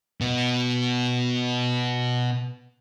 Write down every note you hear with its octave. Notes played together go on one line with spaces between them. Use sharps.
B2 B3